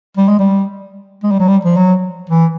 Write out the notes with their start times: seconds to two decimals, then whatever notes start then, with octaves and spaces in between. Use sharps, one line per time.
0.17 G3
0.29 G#3
0.39 G3
1.23 G#3
1.31 G3
1.40 F#3
1.48 G3
1.65 F3
1.76 F#3
2.30 E3